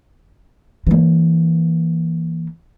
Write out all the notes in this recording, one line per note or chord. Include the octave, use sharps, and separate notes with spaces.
E3 A#3